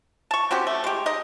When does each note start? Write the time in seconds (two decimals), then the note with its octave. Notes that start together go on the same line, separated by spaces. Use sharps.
0.31 A5 C#6
0.51 C4 C#4 F#4 G4
0.67 A3
0.84 G#3 G4
1.06 D#4 D#5